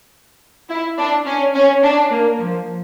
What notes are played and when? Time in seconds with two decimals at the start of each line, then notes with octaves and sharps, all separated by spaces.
0.70 E4
0.98 D4
1.26 C#4
1.54 C#4
1.83 D4
2.10 A#3
2.39 F3